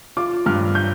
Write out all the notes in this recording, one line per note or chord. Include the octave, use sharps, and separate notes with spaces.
F4 D6
G2 F6
G6